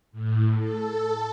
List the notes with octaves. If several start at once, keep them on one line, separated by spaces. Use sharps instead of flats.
A2
A4